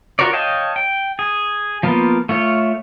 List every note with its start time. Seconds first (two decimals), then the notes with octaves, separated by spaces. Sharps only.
0.19 F4 F#4 A#4 C#5 D5
0.33 C#5 D#5 F5 G5 A5
0.76 G5
1.19 G#4
1.83 F3 A#3 B3 F4
2.29 A3 F4 C#5